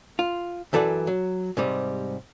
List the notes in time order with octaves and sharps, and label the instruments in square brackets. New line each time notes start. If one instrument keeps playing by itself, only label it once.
[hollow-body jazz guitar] F4
F#2 E3 A4 D5 F#5
F#3
G#2 C3 G3